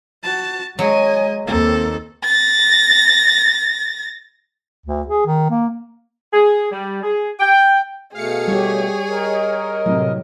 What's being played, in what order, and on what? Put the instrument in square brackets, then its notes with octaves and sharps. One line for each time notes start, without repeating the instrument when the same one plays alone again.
[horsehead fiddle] F#4 A5
[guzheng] F#3 [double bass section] G#3 [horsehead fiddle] D#5 G#5
[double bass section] D#2 D#3 A#3 [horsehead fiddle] C4 A4
[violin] A6 A#6
[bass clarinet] D2
G#4
D#3
A#3
[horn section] G#4
G3
G#4
G5
[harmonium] B2 A3 [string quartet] G#4 [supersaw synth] F5 C#7
[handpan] G3 G4 [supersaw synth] C#5
[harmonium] A#4 D#5
[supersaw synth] A2 C3 [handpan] F#3